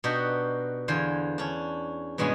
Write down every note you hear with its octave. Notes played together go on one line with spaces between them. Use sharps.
B2 D4 D#4 F#4 G4
E2 D3 C5 F5 G#5
C#4 D4
G2 B2 G#3 B3 C#4 G#5